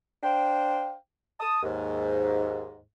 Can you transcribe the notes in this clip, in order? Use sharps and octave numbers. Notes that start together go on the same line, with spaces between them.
D4 C5 F5 G5
A5 D#6
D#2 G#2